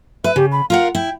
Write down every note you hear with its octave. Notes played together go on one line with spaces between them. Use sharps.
B4 E5
C#3 G4
B5
F4 A#4 F5 F#5
E4 G5